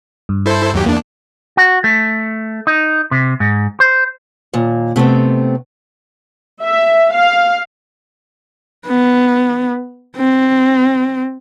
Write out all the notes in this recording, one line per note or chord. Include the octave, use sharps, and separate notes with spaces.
G2
E4 A4 C5
D#2 F#3 G4
E2 A#3 D4
F#4
A3
D#4
C3
G#2
C5
D#2 A#2
C3 A3 B3 C4
E5
F5
B3
C4